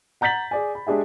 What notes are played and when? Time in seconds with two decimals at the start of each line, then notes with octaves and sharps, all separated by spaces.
0.21 F#5 A#5 G6 A6 B6 F#7
0.51 G#4 D5 G#5
0.75 B5
0.87 G#3 D4 G4 G#4 E5